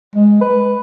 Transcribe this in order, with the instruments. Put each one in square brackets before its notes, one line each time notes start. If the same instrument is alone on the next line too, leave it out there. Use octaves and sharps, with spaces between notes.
[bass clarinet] G#3
B4